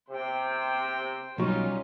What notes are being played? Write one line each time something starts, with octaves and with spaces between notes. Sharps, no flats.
C3 C5 G5
B1 F#3 G3 C#4 D#4 F4